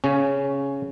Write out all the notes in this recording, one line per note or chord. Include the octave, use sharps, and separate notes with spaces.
C#3 C#4